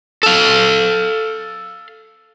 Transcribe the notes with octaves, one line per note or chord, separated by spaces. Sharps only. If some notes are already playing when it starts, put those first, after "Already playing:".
A4 F5